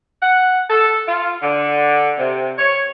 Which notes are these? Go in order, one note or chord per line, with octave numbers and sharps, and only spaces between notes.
F#5
A4
F4
D3
C3
C#5